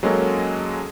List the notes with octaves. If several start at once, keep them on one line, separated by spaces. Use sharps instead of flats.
F#3 G#3 A#3 C#4 A4